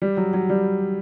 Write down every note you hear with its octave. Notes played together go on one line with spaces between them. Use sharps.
G3
F#3
F#3
G3